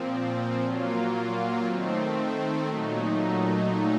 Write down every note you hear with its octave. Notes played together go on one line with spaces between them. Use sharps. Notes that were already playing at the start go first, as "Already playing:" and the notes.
Already playing: A#2 F3 C4
A#2 F#3 A#3 F4
D#3 A3 C4
A#2 F#3 A3 D#4